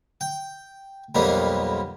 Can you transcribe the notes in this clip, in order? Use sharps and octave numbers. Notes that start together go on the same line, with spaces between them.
G5
B1 F2 G3 A#3 B3